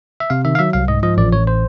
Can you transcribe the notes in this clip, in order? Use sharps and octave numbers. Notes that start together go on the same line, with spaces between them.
E5
C3 F5
D#3 E5
F5
F#3 E5
C2 F5
G#2 D#5
F3 D#5
A1 D5
A1 C#5
C5